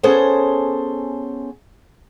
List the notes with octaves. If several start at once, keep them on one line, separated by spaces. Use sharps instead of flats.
B3 C#4 G#4 A4 C5